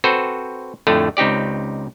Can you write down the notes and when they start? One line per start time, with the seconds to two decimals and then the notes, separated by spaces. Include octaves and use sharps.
0.04 C4 F#4 A4 B4 C5
0.87 F2 A2 D3 A3
1.17 C#2 C4 D#4 G4 D5